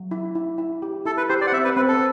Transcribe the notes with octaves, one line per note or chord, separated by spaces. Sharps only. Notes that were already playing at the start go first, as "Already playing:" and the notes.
Already playing: F#3
E4
E4
E4
G4
E4 A4
B4
G4 C5
D5
F#5
C4 E5
B4
C4 B4
A4